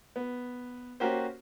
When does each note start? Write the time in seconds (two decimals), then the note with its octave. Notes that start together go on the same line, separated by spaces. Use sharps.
0.16 B3
1.00 A#3 C#4 F#4 G4 A#4 C5